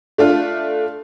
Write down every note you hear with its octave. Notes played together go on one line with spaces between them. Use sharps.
A3 D4 F4